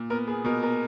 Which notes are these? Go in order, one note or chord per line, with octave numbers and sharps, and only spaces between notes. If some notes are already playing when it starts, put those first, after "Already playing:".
Already playing: A#2
B3 A#4
B3 G#4
B2 A#4
B3 A#4